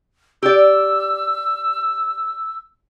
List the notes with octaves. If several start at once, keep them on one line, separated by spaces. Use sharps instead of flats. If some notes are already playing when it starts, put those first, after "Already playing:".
G4 D5 E6